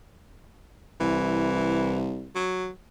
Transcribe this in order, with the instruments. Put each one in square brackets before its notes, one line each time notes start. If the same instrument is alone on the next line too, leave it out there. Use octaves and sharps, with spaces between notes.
[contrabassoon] C2 [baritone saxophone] E3
[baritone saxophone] F#3